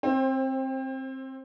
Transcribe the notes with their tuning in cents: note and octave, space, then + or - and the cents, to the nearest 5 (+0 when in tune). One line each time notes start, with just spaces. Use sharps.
C4 +15 C5 +35